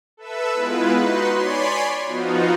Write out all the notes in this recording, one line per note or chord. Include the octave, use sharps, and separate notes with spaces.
A4 B4 E5 E6
G#3 B3 E4 F4 B4
D#4 F#4 B4 C6
C#5 D5 G#5 B5 C6
F3 B3 D#4 F4 F#4